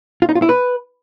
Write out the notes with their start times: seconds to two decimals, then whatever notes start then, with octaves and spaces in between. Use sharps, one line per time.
0.22 F4
0.29 D#4
0.35 F4
0.42 E4
0.49 B4